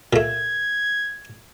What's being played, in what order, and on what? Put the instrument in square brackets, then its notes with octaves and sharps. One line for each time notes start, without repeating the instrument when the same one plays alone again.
[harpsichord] A#2 A3 [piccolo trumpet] G#6